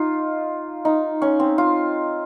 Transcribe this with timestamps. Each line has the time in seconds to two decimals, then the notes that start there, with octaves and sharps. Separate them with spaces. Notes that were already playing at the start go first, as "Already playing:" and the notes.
Already playing: D#4 F4
0.85 D#4
1.22 C#4
1.39 C4
1.58 F4